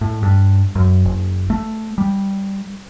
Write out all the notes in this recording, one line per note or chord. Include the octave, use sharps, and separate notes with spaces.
A2
G2
F#2
F#1
A3
G3